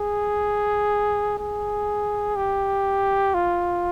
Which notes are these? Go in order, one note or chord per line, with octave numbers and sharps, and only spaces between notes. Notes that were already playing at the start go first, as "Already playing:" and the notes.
Already playing: G#4
G#4
G4
F4